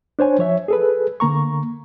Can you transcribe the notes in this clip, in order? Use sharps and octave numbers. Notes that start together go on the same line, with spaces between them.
D4 C5 C#5 G#5
F3 C#5 E5
G#4 A4 B4
D3 A#3 A#5 C#6